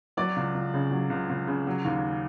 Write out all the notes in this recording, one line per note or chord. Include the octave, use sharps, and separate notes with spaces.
F#3 D5
C#2
C#2
C#3
F#3
C#2
C#2
C#3
F#3
D#2